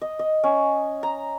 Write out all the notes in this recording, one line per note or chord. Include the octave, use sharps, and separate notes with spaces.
D#5
D#5
C#4
A#5